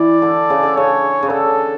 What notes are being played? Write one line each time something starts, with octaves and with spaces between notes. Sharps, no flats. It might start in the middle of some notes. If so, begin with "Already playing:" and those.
Already playing: E3 D5
D3
C#3
D3
C#3 C#5
C#3
D3 A4